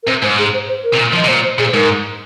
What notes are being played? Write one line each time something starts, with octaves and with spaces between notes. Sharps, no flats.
A#4
C3 C5
G#2 C5
G#4
C5
C5
A#4
C3
A#2
F3
D#5
C3
A#2 C5
C5
A#2 G#4
C5
G#2 A#4